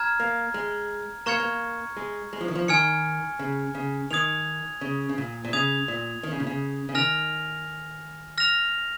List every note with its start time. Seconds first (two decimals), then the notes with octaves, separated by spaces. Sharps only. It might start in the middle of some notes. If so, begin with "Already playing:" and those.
Already playing: A#5 F6 G#6
0.20 A#3
0.54 G#3
1.26 A#3 A#5 C#6 F6 G#6 C#7
1.40 A#3
1.97 G#3
2.33 G#3
2.41 F3
2.48 D#3
2.55 F3
2.68 D#3 G#5 F6 G#6 C#7
3.39 C#3
3.75 C#3
4.11 D#3 D#6 G#6 F7
4.81 C#3
5.09 C#3
5.18 A#2
5.45 A#2
5.53 C#3 D#6 G#6 F7
5.88 A#2
6.23 D#3
6.32 C#3
6.40 A#2
6.47 C#3
6.89 C#3
6.95 D#3 G#5 F6 A#6 F7
8.38 F6 A#6 F7